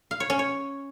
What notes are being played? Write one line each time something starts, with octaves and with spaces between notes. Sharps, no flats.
F5
C#5
C#4
C#5